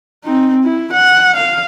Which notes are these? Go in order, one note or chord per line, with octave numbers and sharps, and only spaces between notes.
C4 D#4
E4
F#5
F5